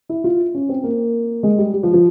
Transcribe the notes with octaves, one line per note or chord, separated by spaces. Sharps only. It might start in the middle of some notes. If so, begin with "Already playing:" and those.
E4
F4
C#4
C4
A#3
G#3
G3
G3
F3
F3